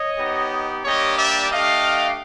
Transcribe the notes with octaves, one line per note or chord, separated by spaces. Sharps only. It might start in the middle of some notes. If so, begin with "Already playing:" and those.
Already playing: C#5 D#5
B3 D#4 G4
G3 A#3 D4 G4 C#5 D#5
D5 E5
A3 D4 G4 D#5 F5